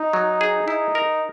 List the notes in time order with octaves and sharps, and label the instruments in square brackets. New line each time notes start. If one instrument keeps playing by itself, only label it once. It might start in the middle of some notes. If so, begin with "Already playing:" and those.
Already playing: [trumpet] D#4
[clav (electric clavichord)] F#3
G#4
[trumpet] D#4 [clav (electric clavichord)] E4
[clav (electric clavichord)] A#4